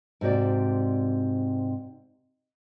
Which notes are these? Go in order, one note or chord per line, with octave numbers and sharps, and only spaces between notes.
G#2 C3 F#4 D5